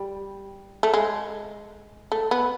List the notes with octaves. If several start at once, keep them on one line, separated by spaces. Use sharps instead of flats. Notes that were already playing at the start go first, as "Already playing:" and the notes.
Already playing: G3
A3
G#3
A3
B3